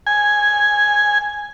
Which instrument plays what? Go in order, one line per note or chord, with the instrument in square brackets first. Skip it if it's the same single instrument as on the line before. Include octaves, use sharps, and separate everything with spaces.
[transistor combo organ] G#5